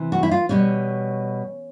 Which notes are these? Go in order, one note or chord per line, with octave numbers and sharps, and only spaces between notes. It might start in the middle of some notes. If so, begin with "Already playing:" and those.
Already playing: C3 E3
F#4
E4
F4
B2 G3 C#4